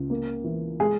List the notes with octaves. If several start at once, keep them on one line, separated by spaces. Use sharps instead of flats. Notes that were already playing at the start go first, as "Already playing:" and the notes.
Already playing: C#2
A#3
E3
G#3 G#4